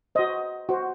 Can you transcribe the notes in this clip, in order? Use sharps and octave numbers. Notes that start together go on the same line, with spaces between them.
F#4 C5 D#5
F#4 C5